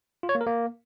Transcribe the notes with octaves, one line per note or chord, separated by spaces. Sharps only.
F4
C#5
A#3
A#4
A#3